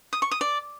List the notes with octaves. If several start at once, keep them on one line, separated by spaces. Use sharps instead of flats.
D#6
C#6
D#6
D5